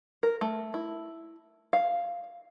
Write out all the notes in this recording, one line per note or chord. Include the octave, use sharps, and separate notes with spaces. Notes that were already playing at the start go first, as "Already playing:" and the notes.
A#4
A3
E4
F5